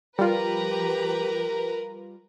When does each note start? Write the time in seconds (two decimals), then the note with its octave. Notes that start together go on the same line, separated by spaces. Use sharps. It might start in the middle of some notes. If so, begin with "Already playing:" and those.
0.19 F3 G3 F4 G4 A#4 B4 A#5